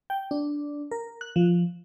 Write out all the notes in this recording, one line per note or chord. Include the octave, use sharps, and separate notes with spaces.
G5
D4
A#4
F#6
F3